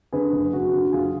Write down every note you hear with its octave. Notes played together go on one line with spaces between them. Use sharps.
D3 G#4 B4
F#1
F#1 F#4
D3
F#1 F4 G#4